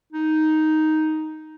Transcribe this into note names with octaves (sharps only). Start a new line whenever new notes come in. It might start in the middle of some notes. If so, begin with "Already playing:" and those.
D#4